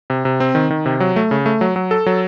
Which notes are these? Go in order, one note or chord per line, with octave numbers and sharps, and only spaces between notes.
C3
C3
C4
D#3
D#3
C3
F#3
A3
C#3
A3
F#3
F#3
A4
F#3